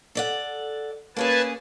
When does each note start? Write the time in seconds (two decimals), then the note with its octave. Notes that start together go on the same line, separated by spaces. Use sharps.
0.15 A4 D5 F#5
1.16 A#3 C#4 G#4 B4 G#5 A5